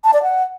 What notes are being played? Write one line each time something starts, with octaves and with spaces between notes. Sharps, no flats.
A5
D5
F#5